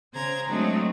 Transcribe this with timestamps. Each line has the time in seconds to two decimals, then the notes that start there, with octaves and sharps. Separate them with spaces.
0.13 C#3 C5 A#5 G#6
0.49 F#3 G#3 A3 C4 D4 D#4